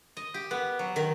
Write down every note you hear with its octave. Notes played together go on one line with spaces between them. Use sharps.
D#5
G4
B3
F#3
D#3